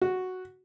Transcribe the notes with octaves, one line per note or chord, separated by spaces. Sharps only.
F#4